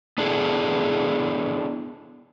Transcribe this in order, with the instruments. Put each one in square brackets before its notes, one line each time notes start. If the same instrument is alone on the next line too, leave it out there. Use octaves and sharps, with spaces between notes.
[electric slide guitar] B3 D4 E4 G#4 A4